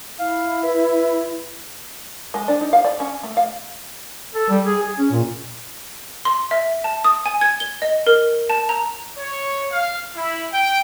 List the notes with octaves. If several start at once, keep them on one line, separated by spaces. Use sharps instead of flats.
E4 F5
B4 E5
G#3
D4
D#4
F5
D5
C#4
A3
F5
A4
G3
G#4
G#4
C#4
A#2
C6
E5
A5
D#6
G#5
G#6
G7
D#5
A#4
A5
A#5
C#5
F5
E4
G5